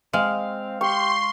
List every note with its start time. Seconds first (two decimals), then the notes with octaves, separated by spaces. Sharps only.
0.13 G#3 C4 F5
0.81 G4 C6 C#6